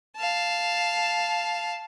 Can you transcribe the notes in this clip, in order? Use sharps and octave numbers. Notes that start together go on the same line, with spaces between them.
F5 A5